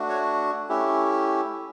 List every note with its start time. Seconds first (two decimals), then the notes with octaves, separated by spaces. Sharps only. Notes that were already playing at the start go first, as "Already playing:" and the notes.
Already playing: A3 D4 F#4
0.09 C#5
0.69 A3 C#4 E4 G4